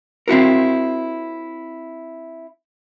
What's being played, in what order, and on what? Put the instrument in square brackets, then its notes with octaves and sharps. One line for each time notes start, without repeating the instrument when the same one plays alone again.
[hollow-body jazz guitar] C4 E4 F#4 A#4